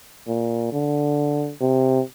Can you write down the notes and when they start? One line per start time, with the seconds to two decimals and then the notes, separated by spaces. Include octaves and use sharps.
0.28 A#2
0.72 D3
1.61 C3